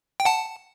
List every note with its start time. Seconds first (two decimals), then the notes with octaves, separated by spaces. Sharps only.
0.20 G5
0.25 F#5 A5